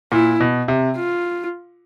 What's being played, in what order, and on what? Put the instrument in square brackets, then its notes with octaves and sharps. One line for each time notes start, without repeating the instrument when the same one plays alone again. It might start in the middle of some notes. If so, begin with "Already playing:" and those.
[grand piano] A#2 [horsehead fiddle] E4
[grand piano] B2
C3
[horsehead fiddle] F4